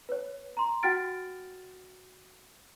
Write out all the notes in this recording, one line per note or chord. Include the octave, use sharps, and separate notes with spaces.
B4 C#5
A#5 C6
F#4 F#5 G5 F6 A6 D7